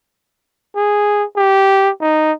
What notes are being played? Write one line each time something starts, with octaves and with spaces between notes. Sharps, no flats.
G#4
G4
D#4